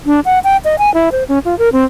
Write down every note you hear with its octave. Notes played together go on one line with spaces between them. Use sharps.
D4
F#5
G5
D#5
G#5
E4
C5
C#4
F4
A#4
C4